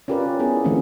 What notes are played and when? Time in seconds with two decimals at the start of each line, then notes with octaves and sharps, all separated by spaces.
0.08 C#4 F4 G4 A#4 B4 D5
0.39 B3 E4 G#4
0.64 D#3 F3 A3 A#3 C4 C#4